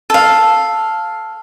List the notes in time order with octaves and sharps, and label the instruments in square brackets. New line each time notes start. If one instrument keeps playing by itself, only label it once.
[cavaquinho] A4 F5